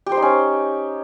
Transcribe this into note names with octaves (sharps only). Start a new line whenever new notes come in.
G4
C5
D#4
C#4